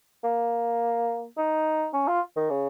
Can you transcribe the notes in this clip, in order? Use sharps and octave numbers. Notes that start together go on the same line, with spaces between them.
A#3
D#4
C#4
F4
D#3
C#3